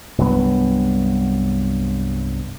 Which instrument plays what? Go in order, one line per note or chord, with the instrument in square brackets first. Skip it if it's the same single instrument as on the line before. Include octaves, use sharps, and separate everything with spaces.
[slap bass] C2 G2 F#3 B3